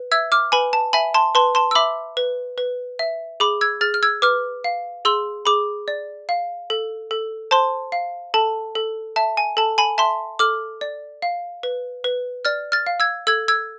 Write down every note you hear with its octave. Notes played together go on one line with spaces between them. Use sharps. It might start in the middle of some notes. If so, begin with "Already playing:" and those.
Already playing: B4
E5 E6 G#6
D6 F6
B4 G#5 B5
A5
E5 G#5 B5
A5 C6
B4 A5 C6
A5 C6
E6
E5 B5 D6
B4
B4
E5
G#4 B5 D6
E6 G#6
G#4 F6 A6
F6
E6 G#6
B4 D6 F6
F5
G#4 C6 E6
G#4 B5 D6
D5
F5
A4
A4
C5 A5 C6
F5
A4 A5
A4
E5 A5
G#5
A4 A5
G#5 B5
E5 A5 C6
A4 D6 F6
D5
F5
B4
B4
D5 F6 A6
F6 A6
F5
E6 G#6
A4 E6 G#6
E6 G#6